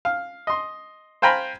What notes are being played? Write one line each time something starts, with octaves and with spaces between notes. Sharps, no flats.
F5
D#5 C6
C5 F5 G5 G#5 A#5 B5